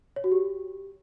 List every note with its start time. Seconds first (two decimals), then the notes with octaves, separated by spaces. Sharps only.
0.16 C#5
0.24 F#4
0.32 G4